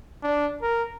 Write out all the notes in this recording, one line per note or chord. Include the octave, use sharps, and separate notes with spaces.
D4
A#4